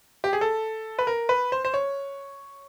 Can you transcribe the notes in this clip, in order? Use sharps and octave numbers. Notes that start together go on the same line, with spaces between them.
G4
G#4
A4
B4
A#4
B4
C5
C5
C#5